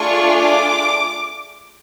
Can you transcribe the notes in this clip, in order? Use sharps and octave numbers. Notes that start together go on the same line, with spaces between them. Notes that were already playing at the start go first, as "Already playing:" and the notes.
Already playing: A3 D4 F4 G#4 C#6
D6